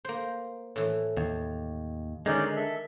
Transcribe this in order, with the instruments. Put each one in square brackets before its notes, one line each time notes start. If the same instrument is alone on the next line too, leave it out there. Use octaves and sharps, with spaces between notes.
[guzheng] A#3 C5
A2 E3
[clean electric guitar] D#2
[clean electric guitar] D3 G#3 [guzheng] D#3 [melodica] C#4 D#4 D5
[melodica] A4 E5